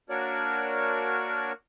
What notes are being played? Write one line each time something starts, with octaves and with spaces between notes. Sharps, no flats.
A#3 D4 F#4 A#4 C#5 D5